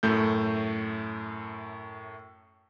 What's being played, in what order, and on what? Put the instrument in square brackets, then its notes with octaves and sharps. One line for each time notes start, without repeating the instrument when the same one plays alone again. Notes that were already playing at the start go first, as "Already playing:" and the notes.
[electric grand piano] F#2 A2 A3 G6